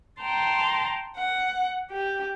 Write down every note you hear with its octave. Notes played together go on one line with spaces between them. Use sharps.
G5 A5 A#5 C6
F#5
G4